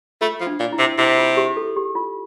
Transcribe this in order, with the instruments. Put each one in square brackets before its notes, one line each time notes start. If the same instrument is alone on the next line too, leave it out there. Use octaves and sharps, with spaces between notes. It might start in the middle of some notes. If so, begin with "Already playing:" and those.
[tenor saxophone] A3 [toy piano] F4
[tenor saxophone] F3
[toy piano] D4
[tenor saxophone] A#2
[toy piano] E4
[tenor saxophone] C3
[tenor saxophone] C3 [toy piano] E4
[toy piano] F4
G4
A4
G4
F4